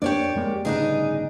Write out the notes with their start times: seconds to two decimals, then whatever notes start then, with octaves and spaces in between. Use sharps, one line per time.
0.02 F2 A#3 D4 G4 C#5 D5
0.35 F2 G#3 A#3
0.65 G1 A2 C#3 D4 D#4 G#4